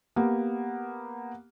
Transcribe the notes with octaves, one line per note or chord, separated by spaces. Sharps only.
A#3 B3 G4